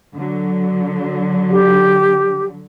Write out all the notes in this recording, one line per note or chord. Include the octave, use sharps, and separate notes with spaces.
D3 F#3
G4